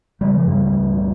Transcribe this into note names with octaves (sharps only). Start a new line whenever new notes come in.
C#3 G3
F3
G2 G3
C#2
A#2